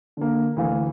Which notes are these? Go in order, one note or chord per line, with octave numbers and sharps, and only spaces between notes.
D3 A#3
D2 E3 F5